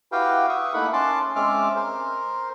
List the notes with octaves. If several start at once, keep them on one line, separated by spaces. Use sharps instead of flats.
E4 F#4 G4 B4 F5 G5
E5 C#6 D#6
A3 A#3 D#4 E4 F#5 B5
C#4 A5 C6 D6
G#3 C4 C#4 E5 D6 F6
A#4 C5